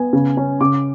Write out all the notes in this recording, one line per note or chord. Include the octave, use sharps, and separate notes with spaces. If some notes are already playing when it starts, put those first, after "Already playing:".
Already playing: B3 G#5
C#3
C#4
C#3 D6